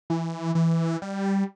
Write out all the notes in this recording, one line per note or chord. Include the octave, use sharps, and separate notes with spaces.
E3
E3
G3